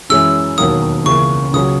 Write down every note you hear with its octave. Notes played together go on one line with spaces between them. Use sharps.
F#2 E3 G#3 C#4 E4 E6
E1 D#2 D#3 F#3 A#3 D#6
C#2 C#3 E3 A#3 C#6
C#2 C#3 F#3 D#6